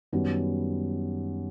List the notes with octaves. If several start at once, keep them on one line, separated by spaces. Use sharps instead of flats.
F#2 D#3 G3 B3